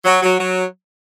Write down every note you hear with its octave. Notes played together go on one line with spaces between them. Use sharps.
F#3
F#3
F#3